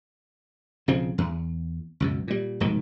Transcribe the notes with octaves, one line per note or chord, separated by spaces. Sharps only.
B1 C#3 F3 C4
E2
C#2 F#2 B2
A#2 G3
F1 G#2 B2 D#3